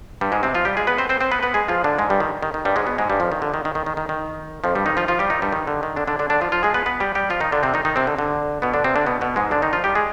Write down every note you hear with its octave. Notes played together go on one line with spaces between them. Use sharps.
G2 G3
G#2 G#3
C3 C4
F3 F4
G3 G4
G#3 G#4
B3 B4
C4 C5
C4 C5
C4 C5
B3 B4
B3 B4
G#3 G#4
F3 F4
D3 D4
G#2 G#3
G2 G3
D#3
D#3
D#3
G2 G3
G#2 G#3
B2 B3
G#2 G#3
G2 G3
F2 F3
D#3
D3
D#3
D#3
D#3
D#3
D#3
D#3
F2 F3
G2 G3
D#3 D#4
F3 F4
F3 F4
G3 G4
D#3 D#4
G2 G3
D#3
D3
D#3
D3 D4
D3 D4
D3 D4
D3 D4
F3 F4
F3 F4
G#3 G#4
B3 B4
B3 B4
G3 G4
G3 G4
F3 F4
D#3 D#4
D3 D4
C3 C4
D#3 D#4
D#3 D#4
C3 C4
D3
D3
B2 B3
D3 D4
C3 C4
D3 D4
B2 B3
B2 B3
G#2 G#3
D3 D4
D#3 D#4
F3 F4
G3 G4
G#3 G#4